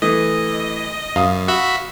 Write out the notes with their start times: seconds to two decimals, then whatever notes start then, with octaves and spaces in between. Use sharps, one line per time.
0.02 E3 A3 D#5 D#6
1.16 F#2 F5 D#6
1.48 F#4 E5 B5